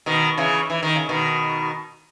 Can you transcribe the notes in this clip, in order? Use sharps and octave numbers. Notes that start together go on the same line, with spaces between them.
B2 D#3
C#3 E3
E3
D#3
C#3
B2 D#3